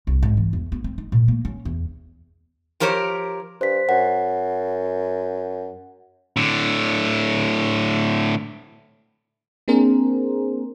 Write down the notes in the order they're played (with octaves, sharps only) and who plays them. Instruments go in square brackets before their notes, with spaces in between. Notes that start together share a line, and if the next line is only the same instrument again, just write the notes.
[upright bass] C2
G#2
E3
E2
B3
C4
D#4
A#2
A#3
C#4
E2
[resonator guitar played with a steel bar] F3 G4 A#4 C5 C#5
[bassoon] G2 [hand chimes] C5 B6
[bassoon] F#2 [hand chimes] F#5
[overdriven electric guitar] A2 D3
[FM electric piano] A#3 C4 D4 G#4 A#4 C5